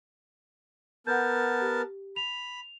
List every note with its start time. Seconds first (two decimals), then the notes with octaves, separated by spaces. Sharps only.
1.07 B3 A#4 F#5 A5 G6
1.61 G4
2.16 B5 F7